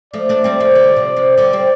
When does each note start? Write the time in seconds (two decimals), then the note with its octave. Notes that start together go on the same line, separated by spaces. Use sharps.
0.14 F3 A3 D5
0.29 A3 D4
0.44 G3 C4
0.60 F3 A3
0.75 D3 G3
0.96 C3 F3
1.16 C3 F3
1.38 D3 G3 D5
1.53 G3 C4